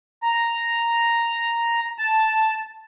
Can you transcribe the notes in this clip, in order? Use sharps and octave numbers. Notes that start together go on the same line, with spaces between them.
A#5
A5